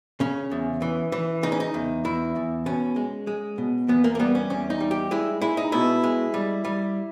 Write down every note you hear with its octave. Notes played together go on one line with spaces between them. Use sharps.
C#3 C#4
E2
E3
E3
C#3 D#4
C#4
D#4
E2
E2 E4
E2
B2 C#4
G#3
G#3
B2
E2 B3
A#3
A#3
G3 B3
C#4
E2 C#4
D#4
G3
G4
G#3 E4
G#3 E4
D#4
B2 E4
G#3
G3
G3